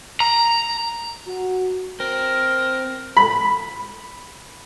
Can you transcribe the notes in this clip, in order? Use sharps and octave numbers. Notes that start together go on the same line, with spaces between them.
A#5
F#4
C4 A#4
B5